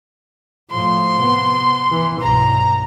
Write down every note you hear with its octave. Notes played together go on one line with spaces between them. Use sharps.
A2 F3 C6
C3 B3
E3
B1 G2 A#5